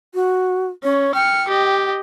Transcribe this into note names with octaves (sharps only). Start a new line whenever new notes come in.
F#4
C#4 C#5
G5 F6 C#7
G4 D#5